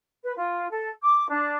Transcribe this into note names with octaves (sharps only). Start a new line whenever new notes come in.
B4
F4
A4
D6
D4